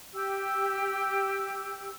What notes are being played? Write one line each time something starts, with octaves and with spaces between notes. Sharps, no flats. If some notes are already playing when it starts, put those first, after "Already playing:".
G4 E6